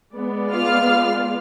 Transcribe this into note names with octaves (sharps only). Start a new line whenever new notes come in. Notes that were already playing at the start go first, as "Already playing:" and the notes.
G#3 B3 D5
F4 F6